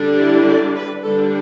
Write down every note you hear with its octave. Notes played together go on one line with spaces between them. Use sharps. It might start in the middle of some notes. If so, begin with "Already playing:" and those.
Already playing: D3 G3 D4
E4
D5
B4
D3 G3 D4 A4